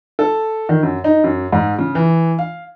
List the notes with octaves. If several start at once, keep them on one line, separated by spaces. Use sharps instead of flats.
A4
D#3
F#2
D#4
F#2
G#2
C#3
E3
F5